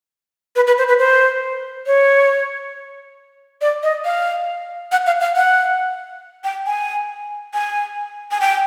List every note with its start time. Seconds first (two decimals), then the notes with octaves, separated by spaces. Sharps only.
0.56 B4
0.67 B4
0.78 C5
0.88 B4
0.99 C5
1.86 C#5
3.61 D5
3.83 D#5
4.05 F5
4.92 F#5
5.06 F5
5.21 F5
5.36 F#5
6.44 G5
6.66 G#5
7.54 G#5
8.31 G#5
8.41 G5